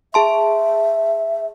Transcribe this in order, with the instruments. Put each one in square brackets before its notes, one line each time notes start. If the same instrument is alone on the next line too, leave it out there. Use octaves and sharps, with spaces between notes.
[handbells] G#4 A5 C6 [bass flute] E5